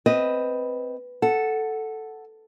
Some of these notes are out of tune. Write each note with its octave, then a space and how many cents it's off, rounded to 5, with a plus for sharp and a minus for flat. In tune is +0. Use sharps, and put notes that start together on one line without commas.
C4 +0 B4 +0 D#5 +5
A4 +0 F#5 +0